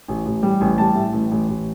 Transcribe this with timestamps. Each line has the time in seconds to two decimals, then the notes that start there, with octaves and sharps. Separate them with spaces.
0.08 A1
0.26 A1
0.43 G3
0.61 A1
0.78 G3 A5
0.96 A2
1.13 A1
1.32 A1
1.49 A1